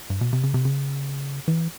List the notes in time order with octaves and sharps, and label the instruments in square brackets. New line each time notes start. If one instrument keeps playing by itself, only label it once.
[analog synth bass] G2
B2
C3
C#3
C3
C#3
E3